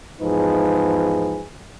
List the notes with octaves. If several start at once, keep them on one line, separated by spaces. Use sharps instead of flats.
E2 G#2 F3 D#4 G#4 B4